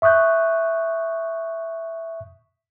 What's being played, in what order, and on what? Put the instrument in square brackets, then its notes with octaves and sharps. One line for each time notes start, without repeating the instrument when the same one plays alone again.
[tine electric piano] E5 C#6 D#6 F#6 G6